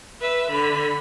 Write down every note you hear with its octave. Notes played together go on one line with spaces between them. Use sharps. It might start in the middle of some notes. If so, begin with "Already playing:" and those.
B4 E5
D3 B5